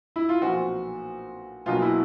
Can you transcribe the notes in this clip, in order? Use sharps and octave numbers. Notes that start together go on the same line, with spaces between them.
E4
F4
B1 A#2 F3 F#4
B1 B2 F#3 A#3 F4
E4